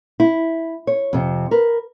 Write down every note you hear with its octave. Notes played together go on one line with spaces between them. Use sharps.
E4
C#5
F2 C3
A#4 B4